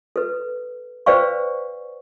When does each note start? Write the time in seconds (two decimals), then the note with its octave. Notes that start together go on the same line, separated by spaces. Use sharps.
0.16 A4 B4
1.06 B4 C5 D5 F5 G5 C#6